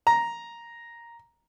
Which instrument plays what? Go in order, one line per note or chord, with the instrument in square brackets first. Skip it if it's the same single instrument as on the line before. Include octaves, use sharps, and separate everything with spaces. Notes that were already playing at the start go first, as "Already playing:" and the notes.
[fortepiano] A#5